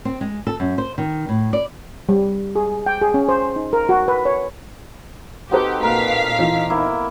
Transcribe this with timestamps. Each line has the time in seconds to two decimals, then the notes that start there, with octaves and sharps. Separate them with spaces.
0.05 C4
0.21 G#3
0.47 A4
0.60 F#2
0.78 C5
0.98 D#3
1.29 A2
1.53 D5
2.09 G3
2.56 G#4
2.86 G5
3.01 G#4
3.14 C#4
3.29 C5
3.56 D#4
3.73 A#4
3.89 F#4
4.08 B4
4.25 C#5
5.51 C4 D#4 F#4 G4 A4 B4
5.83 A#2 A#4 F5 B6
6.39 E3 D#4 F4
6.70 A#3 B3 E4